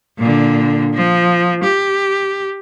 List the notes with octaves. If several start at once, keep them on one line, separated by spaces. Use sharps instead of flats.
A#2 D3
F3
G4